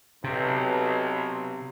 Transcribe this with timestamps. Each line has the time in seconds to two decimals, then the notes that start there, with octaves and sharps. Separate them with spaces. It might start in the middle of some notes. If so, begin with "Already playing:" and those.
0.24 B1 C3